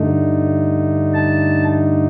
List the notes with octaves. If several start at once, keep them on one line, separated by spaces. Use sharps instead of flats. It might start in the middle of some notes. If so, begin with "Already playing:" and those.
Already playing: G2 D3 A3 D#4
A5